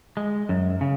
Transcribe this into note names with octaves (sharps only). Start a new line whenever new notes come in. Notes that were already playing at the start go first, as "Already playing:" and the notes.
G#3
F#2
C#3